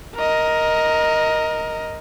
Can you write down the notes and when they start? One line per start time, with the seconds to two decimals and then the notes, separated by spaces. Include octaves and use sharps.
0.16 A#4 D#5